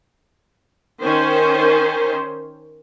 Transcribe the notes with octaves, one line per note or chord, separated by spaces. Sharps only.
D#3 C#4 C5